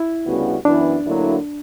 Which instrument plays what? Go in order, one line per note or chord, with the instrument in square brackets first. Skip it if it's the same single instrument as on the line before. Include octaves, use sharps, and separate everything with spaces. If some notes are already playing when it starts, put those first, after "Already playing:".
Already playing: [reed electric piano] E4
[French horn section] D2 C#3 G3 B3 F#4
[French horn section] F#2 E3 B3 E4 [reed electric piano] D4
[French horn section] D2 D3 F#3 A#3 E4